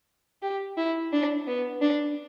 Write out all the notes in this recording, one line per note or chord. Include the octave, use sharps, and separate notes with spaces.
G4
E4
D4
B3
D4